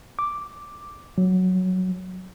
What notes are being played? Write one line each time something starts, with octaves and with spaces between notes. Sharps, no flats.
D6
F#3